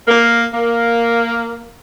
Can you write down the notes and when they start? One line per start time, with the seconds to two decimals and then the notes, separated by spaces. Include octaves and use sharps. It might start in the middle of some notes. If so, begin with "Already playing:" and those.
0.08 A#3
0.54 A#3